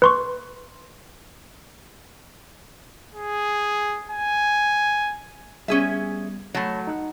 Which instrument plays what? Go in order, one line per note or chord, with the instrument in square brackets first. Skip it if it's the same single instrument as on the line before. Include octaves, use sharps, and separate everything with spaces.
[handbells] B4 C6 C#6
[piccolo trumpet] G#4
G#5
[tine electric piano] G3 B3 [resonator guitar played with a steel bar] C#4 G#4 E5
[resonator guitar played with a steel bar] F#3 A3 [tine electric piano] C#5 A5 B5
[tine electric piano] D#4 F#5